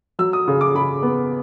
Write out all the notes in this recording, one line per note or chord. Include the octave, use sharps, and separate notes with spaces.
F#3 E6
D#6
C#3
D6
C#3 B5
B3